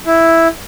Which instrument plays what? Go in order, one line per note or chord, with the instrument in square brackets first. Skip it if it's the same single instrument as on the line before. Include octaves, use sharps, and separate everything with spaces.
[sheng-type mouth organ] E4